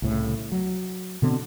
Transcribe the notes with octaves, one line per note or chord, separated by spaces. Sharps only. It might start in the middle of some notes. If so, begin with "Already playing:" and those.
C2 A2 C#3
F#3
B2 D3 B3 C4